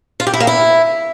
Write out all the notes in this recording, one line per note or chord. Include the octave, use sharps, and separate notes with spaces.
F4
G4
E4
A#3
E4